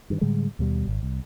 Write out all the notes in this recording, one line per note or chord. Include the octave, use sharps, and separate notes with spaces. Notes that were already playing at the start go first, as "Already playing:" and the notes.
G2 D#3
A2 D3 G3 G#3
D#2 B2 G3
G#1
C2